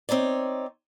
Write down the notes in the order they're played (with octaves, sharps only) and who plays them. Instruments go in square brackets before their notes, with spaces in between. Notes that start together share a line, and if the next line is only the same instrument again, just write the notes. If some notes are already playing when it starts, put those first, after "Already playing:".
[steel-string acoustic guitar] C4 D#4 C#5 D5